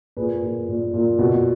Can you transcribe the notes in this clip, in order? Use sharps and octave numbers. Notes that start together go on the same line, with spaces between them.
A#2 G#4 B4
A#2
A#2
A#2
B2